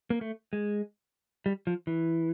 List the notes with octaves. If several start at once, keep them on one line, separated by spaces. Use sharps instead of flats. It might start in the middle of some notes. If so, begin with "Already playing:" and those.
A#3
A3
G#3
G3
F3
E3